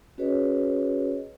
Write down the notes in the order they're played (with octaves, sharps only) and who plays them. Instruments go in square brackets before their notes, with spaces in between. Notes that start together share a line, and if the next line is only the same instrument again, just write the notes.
[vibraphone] C#4 F#4 G#4 B4 C#5 D#5